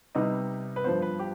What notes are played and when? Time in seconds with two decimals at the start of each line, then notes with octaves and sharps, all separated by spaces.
0.15 C3 G3 B3 D#4 D#5
0.76 B4
0.84 G2 F3 B3 C5
1.02 B4
1.19 G4